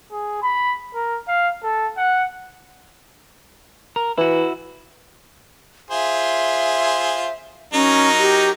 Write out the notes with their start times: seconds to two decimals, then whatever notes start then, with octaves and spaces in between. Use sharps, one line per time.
0.12 G#4
0.43 B5
0.94 A#4
1.28 F5
1.63 A4
1.97 F#5
3.96 A#4
4.18 E3 E4 F#4
5.91 F4 G#4 C5 E5
7.74 F#3 C#4 D#4 A#4
8.19 G4